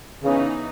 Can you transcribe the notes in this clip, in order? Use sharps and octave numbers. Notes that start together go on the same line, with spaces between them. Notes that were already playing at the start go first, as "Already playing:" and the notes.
C#3 E3 B3 D#4